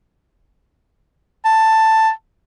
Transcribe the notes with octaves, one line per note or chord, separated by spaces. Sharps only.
A5